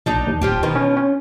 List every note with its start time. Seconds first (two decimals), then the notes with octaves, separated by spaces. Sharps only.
0.06 A#1 D4 D#4 A#5
0.27 D#2
0.41 D1 F3 F4 G4
0.63 B2 D#3 F3 F4
0.75 C#4
0.97 C#4